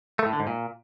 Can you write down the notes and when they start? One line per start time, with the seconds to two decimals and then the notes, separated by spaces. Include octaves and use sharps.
0.19 A3
0.26 A2
0.33 D3
0.40 G#2
0.47 A#2